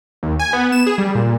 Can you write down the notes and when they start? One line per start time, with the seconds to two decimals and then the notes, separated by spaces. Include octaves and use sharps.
0.23 D#2
0.39 G#5
0.53 B3
0.72 E7
0.87 G#4
0.98 G3
1.15 A#2